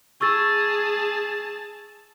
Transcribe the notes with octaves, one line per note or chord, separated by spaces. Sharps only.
G#4 A5 C#6 E6 A6